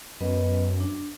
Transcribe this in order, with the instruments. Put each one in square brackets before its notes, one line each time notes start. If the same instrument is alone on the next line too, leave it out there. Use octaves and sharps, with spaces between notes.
[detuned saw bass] F#2 [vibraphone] B3 B4 D#5
[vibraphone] D4